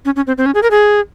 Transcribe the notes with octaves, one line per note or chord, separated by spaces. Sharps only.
C#4
C#4
C4
C4
C#4
G#4
A#4
G#4